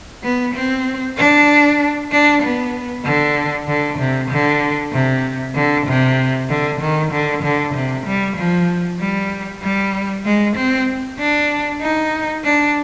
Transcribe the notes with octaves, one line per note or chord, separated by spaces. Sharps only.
B3
C4
D4
D4
B3
D3
D3
C3
D3
C3
D3
C3
D3
D#3
D3
D3
C3
G3
F3
G3
G3
G#3
C4
D4
D#4
D4